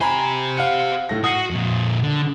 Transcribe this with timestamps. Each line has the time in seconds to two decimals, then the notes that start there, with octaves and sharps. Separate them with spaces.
0.01 G4 C5 G#5 A#5 B5
0.57 F5 F#5 C#7
1.09 A2 A3 A#6
1.24 F#4 D#6 C7 D#7
1.51 F2 A#2
2.03 D3